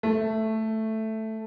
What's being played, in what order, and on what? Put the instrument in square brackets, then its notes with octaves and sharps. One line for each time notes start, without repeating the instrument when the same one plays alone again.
[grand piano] A3